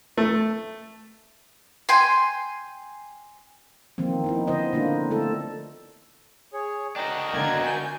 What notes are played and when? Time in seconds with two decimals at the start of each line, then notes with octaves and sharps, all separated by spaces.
0.17 A3
1.89 G5 G#5 C6
3.98 D#3 F3 A#3 C4
4.24 B3 D#4 E4
4.47 D3 B3 C5 D#5
4.73 D3 A#3 D4 F4
5.11 A3 E4 A4
6.54 G#4 C#5
6.96 D4 F#4 A#4 D#5 G5
7.32 D3 A#3 G#6
7.62 G#5 G6